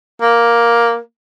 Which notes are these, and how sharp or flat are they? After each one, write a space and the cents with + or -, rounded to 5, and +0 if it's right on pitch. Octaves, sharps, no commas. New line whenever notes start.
A#3 +5